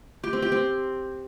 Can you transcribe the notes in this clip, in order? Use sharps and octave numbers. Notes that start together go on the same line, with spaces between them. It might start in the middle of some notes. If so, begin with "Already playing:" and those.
G4
C4
G4
C4